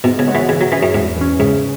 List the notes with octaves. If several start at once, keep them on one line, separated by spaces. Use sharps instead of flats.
G#2 B2
C#3
G#3 B3 F#4 C#5
E3
C#3 E3
F#3
E3 C#4 G#4
F#2
E2 G#2
E3 C#4
G#2 C#3